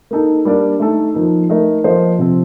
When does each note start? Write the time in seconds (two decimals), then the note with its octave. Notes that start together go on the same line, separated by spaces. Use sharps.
0.11 A#3 D#4 A4
0.45 G3 A#3 D4 G4 D5
0.80 A3 D#4 A4
1.14 F3 A#3 D#4
1.50 A3 D#4 A#4 D#5
1.84 F3 A#3 F4 C5 D#5
2.18 C3 F3 C4